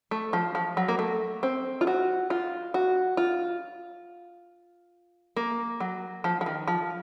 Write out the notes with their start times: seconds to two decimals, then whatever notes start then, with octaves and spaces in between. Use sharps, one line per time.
0.11 A3
0.33 F3
0.55 F3
0.77 F#3
0.88 A#3
0.99 A3
1.43 C4
1.81 F4
1.87 F#4
2.30 F4
2.74 F#4
3.17 F4
5.36 A#3
5.80 F#3
6.24 F3
6.41 F3
6.46 D#3
6.68 F3